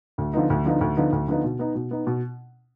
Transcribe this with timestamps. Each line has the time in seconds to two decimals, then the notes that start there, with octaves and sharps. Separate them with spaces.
0.18 D2
0.33 D3 F3 B3 D#4
0.50 D2
0.65 D3 F3 B3 D#4
0.81 D2
0.97 D3 F3 B3 D#4
1.12 D2
1.28 D3 F3 B3 D#4
1.44 B2
1.59 B3 D#4
1.75 B2
1.91 B3 D#4
2.07 B2